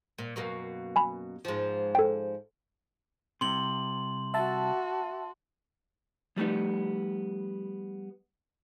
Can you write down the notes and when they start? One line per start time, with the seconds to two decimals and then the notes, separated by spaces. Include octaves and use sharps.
0.18 A#2
0.36 F#2 B2 A#3
0.96 G#5 B5
1.45 G#2 F3
1.95 A4 G5
3.41 C2 C3 C6 F#7
4.34 F#4 E5 A5
6.36 F3 G3 A3 B3 D#4